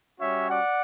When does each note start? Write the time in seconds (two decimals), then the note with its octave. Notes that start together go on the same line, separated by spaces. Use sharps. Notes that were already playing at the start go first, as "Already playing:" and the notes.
0.19 G3 C#4 F#4 C#5 E5
0.48 D5 F#5